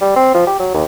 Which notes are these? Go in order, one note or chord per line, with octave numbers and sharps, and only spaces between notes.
G3
C4
F3
G4
F#3
D#2